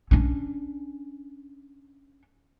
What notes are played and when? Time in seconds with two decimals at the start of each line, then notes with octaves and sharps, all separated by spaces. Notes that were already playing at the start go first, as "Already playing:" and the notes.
0.11 C#4 D4